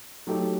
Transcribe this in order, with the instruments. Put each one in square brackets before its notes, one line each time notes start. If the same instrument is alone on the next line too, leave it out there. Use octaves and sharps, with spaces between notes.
[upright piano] F#3 A3 D#4 G4